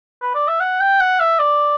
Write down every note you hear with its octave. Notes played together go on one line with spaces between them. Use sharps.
B4
D5
E5
F#5
G5
F#5
E5
D5